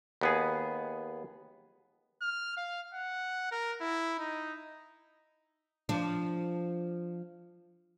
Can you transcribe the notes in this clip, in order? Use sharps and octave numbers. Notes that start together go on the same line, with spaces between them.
D#2 B3 G#4
F6
F5
F#5
A#4
E4
D#4
F3 D4